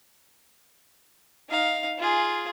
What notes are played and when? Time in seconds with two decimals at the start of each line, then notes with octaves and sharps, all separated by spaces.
1.49 D#4 F5
1.98 F4 G#4